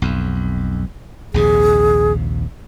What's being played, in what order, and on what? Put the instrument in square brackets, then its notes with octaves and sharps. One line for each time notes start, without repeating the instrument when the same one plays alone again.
[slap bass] B1 F2
[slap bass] A#1 D#2 C3 [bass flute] G#4